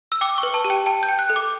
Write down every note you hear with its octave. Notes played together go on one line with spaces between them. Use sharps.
E6
G5 D6
C#6
B4
A5
G4
G5
G5 A5
G6
G5
F#6
A4
D6